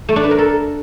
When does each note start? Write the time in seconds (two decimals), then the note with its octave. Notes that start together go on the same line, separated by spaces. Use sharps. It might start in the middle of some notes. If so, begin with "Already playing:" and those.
0.09 A3
0.16 D4
0.23 B4
0.31 A#4
0.38 A4